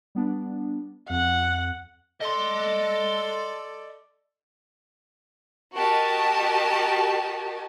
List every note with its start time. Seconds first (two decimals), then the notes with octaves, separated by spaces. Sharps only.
0.15 G3 B3 D4
1.10 F2 F#5
2.21 A4 D5 D#5 C6
5.74 F#4 G4 A#4 D#5 A5